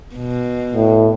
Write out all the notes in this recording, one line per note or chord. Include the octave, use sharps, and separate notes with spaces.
B2
A2